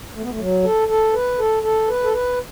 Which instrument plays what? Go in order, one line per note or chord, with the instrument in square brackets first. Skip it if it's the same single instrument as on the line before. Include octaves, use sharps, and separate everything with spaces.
[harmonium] A3
B3
A3
F#3
A4
A4
B4
A4
A4
B4
A4
B4